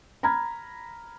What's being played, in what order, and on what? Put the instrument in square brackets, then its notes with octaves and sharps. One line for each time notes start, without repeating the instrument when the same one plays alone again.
[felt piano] A#5 B5 F6 G#6